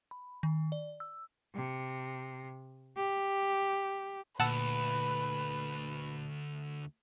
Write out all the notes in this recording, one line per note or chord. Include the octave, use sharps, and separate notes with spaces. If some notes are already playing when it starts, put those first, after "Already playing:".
B5
D#3
D5
E6
C3
G4
D2 A#2 B4 F#5 A5 E6